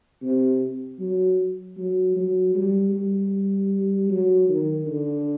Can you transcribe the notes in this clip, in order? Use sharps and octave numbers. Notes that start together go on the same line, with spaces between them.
C3
F#3
F#3
F#3
G3
G3
F#3
D#3
D3